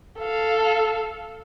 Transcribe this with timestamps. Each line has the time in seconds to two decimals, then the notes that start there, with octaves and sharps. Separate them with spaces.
0.19 A4 F5